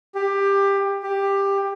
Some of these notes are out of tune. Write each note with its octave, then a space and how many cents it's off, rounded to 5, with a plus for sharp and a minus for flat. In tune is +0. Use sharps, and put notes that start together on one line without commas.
G4 +20
G4 +15